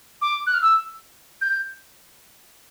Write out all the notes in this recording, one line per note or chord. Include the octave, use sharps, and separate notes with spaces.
D6
F#6
F6
E6
G6